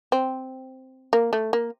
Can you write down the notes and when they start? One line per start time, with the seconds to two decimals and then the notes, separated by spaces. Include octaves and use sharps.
0.12 C4
1.13 A#3
1.33 A3
1.53 A#3